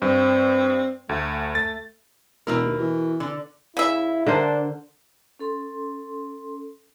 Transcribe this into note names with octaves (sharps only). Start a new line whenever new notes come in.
G2 C4
D2 A3
A3 A6
E1 B2 E4 A#4
D#2
E3
D3
C#3 E4 E5
D3 D4 A#4 C5
C#4 A4 C6